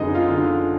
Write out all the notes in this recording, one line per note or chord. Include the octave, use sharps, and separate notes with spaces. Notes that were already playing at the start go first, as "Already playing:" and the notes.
Already playing: F#2 D3 G#3 B3 D#4 D#5
F4 F5
D3